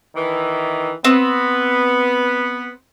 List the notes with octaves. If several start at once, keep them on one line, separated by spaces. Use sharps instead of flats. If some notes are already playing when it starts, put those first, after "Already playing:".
D#3 E3
B3 C4